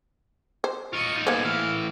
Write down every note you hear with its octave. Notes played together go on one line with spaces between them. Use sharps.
C5
F4 D#5 C#6
D#4 F4
A#3 B3 C5 G#5
E3 A3 F5